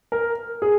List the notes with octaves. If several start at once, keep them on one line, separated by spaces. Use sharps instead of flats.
A#4
G#4